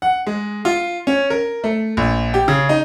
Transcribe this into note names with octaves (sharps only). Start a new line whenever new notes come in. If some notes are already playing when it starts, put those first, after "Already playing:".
F#5
G#3
F4
C#4
A#4
A3
A#1
G4
C#3
D#4